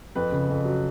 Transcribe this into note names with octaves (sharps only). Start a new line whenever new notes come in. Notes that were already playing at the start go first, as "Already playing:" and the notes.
F2 B4
C#3
F2
F#3